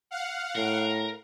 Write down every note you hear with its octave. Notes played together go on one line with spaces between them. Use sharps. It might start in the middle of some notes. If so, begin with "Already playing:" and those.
F5 F#5
A2 A#4